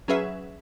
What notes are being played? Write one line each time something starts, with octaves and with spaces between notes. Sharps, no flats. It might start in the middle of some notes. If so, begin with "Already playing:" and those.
F#3 C#4 G#4 B4 E5